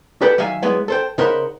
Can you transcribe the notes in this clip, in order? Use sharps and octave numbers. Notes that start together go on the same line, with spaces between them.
G4 A4 B4 F#5 G5
D#3 F#3 E5 F5 G#5
F#3 G#3 B3 E4
A4 C5 G5
C#3 D#4 A#4 C5 F#5 B5